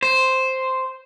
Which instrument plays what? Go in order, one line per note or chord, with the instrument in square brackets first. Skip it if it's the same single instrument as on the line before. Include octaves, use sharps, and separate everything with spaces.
[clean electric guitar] C5